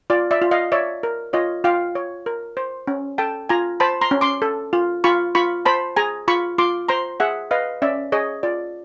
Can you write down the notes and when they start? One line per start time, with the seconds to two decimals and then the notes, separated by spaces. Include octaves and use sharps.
0.10 F4 D5
0.31 D5 E5
0.42 F4
0.51 D#5 F5
0.72 C#5 D5 E5
1.03 A#4
1.33 F4 C#5 D#5
1.64 F4 F5 G5
1.95 C#5
2.26 A#4
2.57 C5
2.87 C#4
3.18 A4 G5 A5
3.49 F4 G#5 A#5
3.80 C5 A5 B5
4.01 A#5 C6
4.11 C#4
4.21 C6 D6
4.42 A4
4.73 F4
5.04 F4 B5 C#6
5.35 F4 B5 C#6
5.65 C5 A5 B5
5.96 G#4 G#5 A#5
6.28 F4 B5 C#6
6.58 F4 C6 D6
6.88 C5 A#5 C6
7.20 G#4 E5 F#5
7.51 B4 D#5 F5
7.82 C#4 D5 E5
8.12 G#4 C#5 D#5
8.43 F4 D5